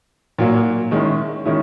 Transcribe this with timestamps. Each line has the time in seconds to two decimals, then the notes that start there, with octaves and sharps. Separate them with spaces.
0.38 A#2 F#3 A#3
0.91 D#3 G#3 C#4 E4
1.45 D#3 G#3 C#4 E4